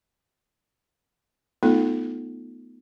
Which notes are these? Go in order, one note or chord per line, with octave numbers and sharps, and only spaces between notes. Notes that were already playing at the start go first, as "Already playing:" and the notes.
A3 B3 D#4 F4 A4